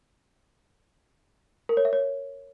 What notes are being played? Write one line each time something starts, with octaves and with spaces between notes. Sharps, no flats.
A#4
C#5
E5
C#5